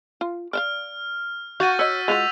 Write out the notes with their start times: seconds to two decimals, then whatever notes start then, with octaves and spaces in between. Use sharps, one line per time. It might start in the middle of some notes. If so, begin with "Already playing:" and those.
0.21 F4
0.53 D5 E5 F5 F6
1.60 F#4 F5 G6 A6 D#7
1.79 C#5 D#5 E6 B6
2.08 G#3 F4 F#4 B6 D#7 F7